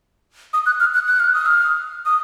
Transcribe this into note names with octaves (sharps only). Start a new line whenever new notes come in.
D#6
F#6
F6
F#6
F#6
F6
D#6
F6
D#6